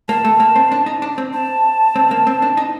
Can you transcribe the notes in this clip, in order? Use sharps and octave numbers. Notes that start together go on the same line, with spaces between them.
A#3 A5
A3
A#3
C4
D4
D#4
D4
C4
A5
C4
A#3
C4
D4
D#4